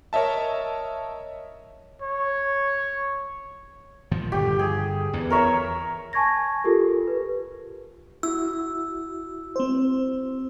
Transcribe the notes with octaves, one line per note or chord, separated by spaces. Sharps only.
A#4 C#5 D#5 E5 A5
C#5
A#2 D#3 F3
G1 G4
G#4
E2 E3
A#4 C#5 E5
G#5 A5 C#6 G#6 A#6
F4 G4 A4 A#4
B4
E4 F#4 E6
C4 C5